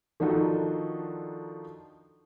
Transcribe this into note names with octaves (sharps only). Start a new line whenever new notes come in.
D#3 F3 D4 D#4 F#4 A4